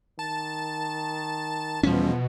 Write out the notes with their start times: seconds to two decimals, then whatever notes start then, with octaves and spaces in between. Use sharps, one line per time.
0.19 D#3 A5
1.83 E2 B2 F3 G3 C#4